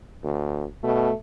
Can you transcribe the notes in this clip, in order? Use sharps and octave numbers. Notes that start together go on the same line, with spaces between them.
D2
B2 A3